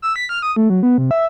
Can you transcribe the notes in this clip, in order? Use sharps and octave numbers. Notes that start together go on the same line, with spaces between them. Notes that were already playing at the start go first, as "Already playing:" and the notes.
E6
B6
F6
D#6
A3
F#3
B3
C3
E5